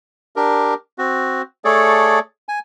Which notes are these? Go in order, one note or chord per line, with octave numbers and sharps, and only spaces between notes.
D4 G4 A#4
C4 F#4
A3 G#4 A4 C#5 D5
G#5